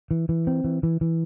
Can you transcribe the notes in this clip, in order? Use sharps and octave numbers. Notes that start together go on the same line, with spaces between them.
E3
E3
C4
E3
E3
E3